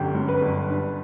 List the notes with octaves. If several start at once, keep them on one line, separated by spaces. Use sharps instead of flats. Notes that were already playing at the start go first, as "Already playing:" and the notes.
Already playing: G1 F#2 D3 F#3 G4
F#2
B4
G1
G2